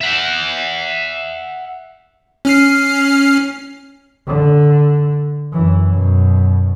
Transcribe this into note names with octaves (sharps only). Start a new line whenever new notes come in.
E5 F#5
C#4 F6 C7
D3
F#2 E3
F#2 B2